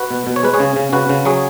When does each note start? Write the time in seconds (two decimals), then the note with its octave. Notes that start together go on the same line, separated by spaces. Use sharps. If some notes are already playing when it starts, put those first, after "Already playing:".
Already playing: F#4 B4
0.11 B2
0.27 B2
0.36 C#5
0.43 G#3 B4
0.54 G#4 C#5
0.60 C#3
0.76 C#3
0.92 C#3 F#4 B4
1.09 C#3
1.25 F#3 G#4 C#5